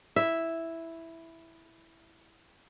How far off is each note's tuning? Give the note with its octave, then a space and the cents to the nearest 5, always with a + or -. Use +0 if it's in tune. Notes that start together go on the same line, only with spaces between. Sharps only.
E4 +0 E5 +0